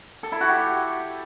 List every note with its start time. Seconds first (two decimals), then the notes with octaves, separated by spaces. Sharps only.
0.23 A4
0.32 E4
0.41 F#4
0.49 G4